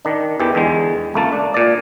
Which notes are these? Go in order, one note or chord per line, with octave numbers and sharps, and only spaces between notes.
D#3 D4
E2 E3 G4
E2 D3 G#3
C#2 A3 A#3 A5
D4
A#2 D5